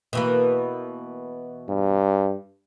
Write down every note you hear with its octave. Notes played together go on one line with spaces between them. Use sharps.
B2 E3 A#3
G2